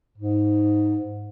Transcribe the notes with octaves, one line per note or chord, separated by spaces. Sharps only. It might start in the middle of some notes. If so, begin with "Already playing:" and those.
G#2